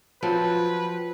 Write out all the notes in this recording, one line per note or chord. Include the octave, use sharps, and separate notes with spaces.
F3 F#3 C4 B4